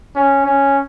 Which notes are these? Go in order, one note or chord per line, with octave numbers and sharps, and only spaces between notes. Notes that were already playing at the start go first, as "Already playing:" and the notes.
C#4
C#4